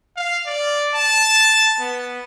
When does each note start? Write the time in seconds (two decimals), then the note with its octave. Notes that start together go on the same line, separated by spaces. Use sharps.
0.16 F5
0.46 D5
0.95 A5
1.79 B3